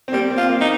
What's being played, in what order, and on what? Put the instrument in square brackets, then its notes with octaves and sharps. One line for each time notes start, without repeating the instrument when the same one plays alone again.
[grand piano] C4
[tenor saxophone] G3 [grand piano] A#3
[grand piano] C4
[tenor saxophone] F4
[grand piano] A#3
[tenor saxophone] D#4